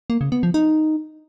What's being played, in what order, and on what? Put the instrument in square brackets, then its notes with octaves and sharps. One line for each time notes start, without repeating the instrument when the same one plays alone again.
[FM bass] A#3
C#3
B3
F3
D#4